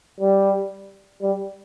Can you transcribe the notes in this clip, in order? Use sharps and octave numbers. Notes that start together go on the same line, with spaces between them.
G3
G3